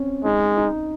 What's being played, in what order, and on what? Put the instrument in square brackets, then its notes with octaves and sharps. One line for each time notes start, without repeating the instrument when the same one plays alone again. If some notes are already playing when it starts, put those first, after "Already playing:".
Already playing: [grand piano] C4 C#4
[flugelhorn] G#3 [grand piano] D#4
[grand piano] D#4